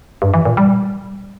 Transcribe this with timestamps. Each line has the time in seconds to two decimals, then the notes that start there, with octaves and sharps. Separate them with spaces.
0.22 G2
0.34 E3
0.45 A#2
0.57 G3